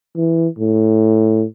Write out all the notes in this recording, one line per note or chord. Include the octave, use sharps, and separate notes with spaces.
E3
A2